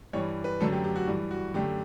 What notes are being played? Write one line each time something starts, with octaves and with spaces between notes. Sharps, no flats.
G2 E3 G3 C#5
B4
F#2 D3 F#3 A3 A4
G4
G4
F#4
G2 E3 G3
F#4
F#2 D3 A3 G4